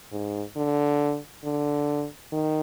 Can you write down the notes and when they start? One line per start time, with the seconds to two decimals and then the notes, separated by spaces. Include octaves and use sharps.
0.12 G#2
0.56 D3
1.44 D3
2.32 D#3